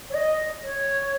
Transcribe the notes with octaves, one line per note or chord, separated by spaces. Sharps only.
C#5
D#5
C#5